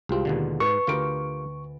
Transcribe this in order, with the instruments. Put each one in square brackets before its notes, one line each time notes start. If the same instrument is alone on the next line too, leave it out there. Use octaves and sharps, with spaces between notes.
[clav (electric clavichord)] C2 C4 [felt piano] G#3 F4 G4
[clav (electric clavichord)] D#2 B2 D3
[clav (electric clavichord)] G#2 [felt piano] B4 [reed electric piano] C#6
[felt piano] D2 B4 D7 [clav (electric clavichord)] F4 G4 A#4